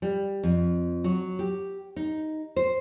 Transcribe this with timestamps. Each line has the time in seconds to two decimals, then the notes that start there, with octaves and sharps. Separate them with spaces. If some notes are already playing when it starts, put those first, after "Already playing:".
0.02 G3
0.43 F2
1.04 F#3
1.39 G4
1.96 D#4
2.56 C5